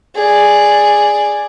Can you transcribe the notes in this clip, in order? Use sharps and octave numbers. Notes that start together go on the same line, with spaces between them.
G#4 D5